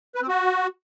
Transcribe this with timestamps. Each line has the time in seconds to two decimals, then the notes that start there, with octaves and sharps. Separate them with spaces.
0.15 B4
0.22 C4
0.28 F#4